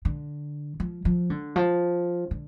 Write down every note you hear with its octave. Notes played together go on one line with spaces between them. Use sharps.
D3
F3
F3
D3
F3
D3